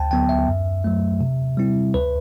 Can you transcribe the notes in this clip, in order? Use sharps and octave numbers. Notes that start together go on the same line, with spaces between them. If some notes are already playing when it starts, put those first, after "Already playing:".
Already playing: D2 G5 A5
D3 F#3 B3 G5
E5
F#2
F#3 A3
C3
G3 C4 E4
D2 B4